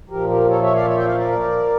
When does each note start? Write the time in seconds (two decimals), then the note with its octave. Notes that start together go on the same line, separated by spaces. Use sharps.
0.10 A#2 F3 G4 A#4
0.29 G4 A#4
0.49 A4 C#5
0.61 C#5 E5
0.74 D5 F5
0.87 C#5 E5
0.97 E5 G5
1.07 D5 F5
1.17 A#4 D5